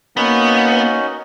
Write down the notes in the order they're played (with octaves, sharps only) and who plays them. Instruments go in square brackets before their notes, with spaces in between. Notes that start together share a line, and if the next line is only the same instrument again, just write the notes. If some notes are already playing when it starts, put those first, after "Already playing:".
[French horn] A#3 [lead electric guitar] B3 [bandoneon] C#4 D#4 F#4